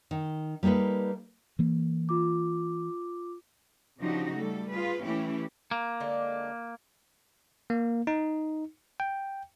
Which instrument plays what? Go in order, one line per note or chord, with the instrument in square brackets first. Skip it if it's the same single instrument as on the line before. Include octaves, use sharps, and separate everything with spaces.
[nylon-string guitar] D#3
G3 A#3 D#4 A4 B4
[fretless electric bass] E3 A#3
[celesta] F4 D6
[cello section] C#3 F3 D4 D#4 F#4 G4
G3 A3 A4
F4 G#4 B4
E3 A3 C#4 E4 G4
[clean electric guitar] A#3
[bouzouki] D3 G#3 D4
[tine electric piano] A#3
D#4
G5